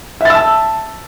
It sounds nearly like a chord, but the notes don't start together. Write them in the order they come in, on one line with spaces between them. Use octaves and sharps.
E5 A6 E6 A5